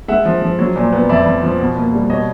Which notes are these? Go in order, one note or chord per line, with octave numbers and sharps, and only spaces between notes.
G#3 E5 F#5
F3
F3
F#3
A#2
B3
F2 D5 E5
F2
F3
B2
A#3
G3
B2 C#5 D#5